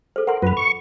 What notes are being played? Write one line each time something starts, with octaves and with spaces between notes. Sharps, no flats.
A4 C5
A#4 F#5 C6
F#2 F4 B4 B5
C#6